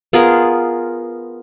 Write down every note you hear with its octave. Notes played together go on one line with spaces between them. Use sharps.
B3 F4 G#4 A#4